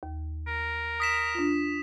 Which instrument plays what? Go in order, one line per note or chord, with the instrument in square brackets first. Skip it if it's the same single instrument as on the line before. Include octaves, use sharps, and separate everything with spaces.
[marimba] D#2
[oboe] A#4
[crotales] D#6 B6 E7
[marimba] D4 F4